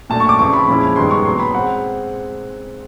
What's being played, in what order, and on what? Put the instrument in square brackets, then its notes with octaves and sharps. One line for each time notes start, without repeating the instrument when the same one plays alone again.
[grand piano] A#2 F#3 A3 D4 A5
C#6
D6
F2 C#3 E3 C#6
B5
A#2 F3 G#3 C#4 E4 B5
G2 D#3 G#3 B3 D#4 C6
C#6
A#2 F#3 B3 C6
B5
G#3 C4 F#5